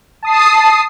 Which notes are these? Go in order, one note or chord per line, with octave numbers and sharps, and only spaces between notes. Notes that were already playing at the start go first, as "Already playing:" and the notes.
A5 D#6 C7